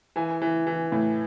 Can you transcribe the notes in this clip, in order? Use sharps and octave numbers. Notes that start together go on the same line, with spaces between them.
E3 G#5
E3
E3
A2